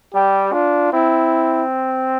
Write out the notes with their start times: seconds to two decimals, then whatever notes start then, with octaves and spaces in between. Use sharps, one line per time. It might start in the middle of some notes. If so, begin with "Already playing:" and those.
0.14 G3 G4
0.53 D4 F4
0.92 C4 E4